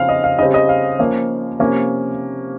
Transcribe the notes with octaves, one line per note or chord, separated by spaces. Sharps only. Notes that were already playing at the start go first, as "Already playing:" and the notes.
Already playing: C#3 F3 C4 F5
D#5
F5
C#3 G3 C4 D#5
D#5
F5
F3 A#3 C#4
C3 F3 A#3 C#4